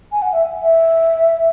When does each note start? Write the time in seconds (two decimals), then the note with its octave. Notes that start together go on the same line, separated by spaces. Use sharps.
0.12 G#5
0.22 F#5
0.33 E5
0.63 E5